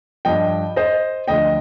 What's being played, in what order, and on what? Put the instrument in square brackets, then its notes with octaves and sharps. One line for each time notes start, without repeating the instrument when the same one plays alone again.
[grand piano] G2 F3 D#5 G5
C5 D#5
D2 D3 F3 D#5 G5